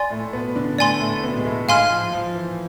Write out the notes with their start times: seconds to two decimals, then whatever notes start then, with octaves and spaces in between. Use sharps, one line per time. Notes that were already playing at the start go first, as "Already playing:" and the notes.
Already playing: D5 G#5 C6
0.10 A2 A3
0.33 B2 B3
0.56 D3 D4
0.78 A2 A3 D5 G#5 C6
1.01 A2 A3
1.23 B2 B3
1.37 G#3
1.45 A2 A3
1.68 G#2 G#3 F5 G#5 C6 F6
1.90 F3
2.13 F3
2.35 E3